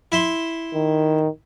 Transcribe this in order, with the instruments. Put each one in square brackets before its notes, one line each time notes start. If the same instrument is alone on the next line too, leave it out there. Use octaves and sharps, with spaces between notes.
[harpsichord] E4 E5 C6
[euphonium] D#3